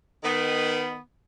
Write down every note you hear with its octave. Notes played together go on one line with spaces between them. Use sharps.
D#3 B3